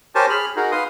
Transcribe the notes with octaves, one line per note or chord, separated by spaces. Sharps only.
G4 A#4 C5 C#5 G#5 A5
G#4 B5 F6
D#4 F#4 G#4 A#4
B4 F5 C6 D#6